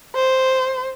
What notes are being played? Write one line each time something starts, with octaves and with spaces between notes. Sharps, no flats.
C5